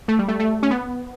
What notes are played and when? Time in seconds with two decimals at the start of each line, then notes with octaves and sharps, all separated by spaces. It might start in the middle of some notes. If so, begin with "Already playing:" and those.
0.08 A3
0.19 G3
0.28 A3
0.40 A3
0.63 C#4
0.71 B3